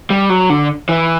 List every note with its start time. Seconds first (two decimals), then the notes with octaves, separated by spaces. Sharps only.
0.10 G3
0.30 F#3
0.50 D3
0.89 E3